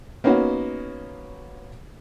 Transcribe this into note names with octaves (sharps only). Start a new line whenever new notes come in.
A#3 B3 C#4 D#4 F#4